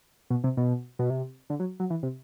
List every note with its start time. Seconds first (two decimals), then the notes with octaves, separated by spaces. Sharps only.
0.30 B2
0.44 C3
0.57 B2
0.99 B2
1.10 C3
1.50 D3
1.60 F#3
1.80 F#3
1.90 E3
2.03 C3